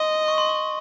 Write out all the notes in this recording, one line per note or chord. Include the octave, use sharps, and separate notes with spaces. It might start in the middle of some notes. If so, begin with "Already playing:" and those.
Already playing: D#5 C6
C#6
C6
C#6